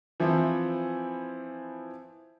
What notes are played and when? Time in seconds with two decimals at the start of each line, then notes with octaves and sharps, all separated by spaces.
0.20 E3 F3 C4 E4